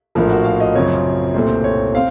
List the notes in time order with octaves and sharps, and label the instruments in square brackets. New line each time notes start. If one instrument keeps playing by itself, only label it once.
[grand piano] A#1 A2 F3 A#4
F#4
F5
D#5
F#2 C#3 F3 C4 C#5
C2 A#2 A3 C4 C5
C#5
C4 F5